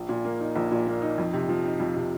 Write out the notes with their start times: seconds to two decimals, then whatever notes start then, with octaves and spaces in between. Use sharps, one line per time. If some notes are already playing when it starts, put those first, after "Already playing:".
Already playing: A#1
0.09 A#2
0.25 A#3
0.40 D#4
0.56 A#1
0.71 A#2
0.87 A#3
1.02 D#4
1.18 F2
1.33 C3
1.49 F3
1.64 D#4
1.80 F2
1.96 C3